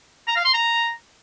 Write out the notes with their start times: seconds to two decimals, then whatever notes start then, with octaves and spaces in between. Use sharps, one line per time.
0.27 A#5
0.36 F5
0.45 C6
0.54 A#5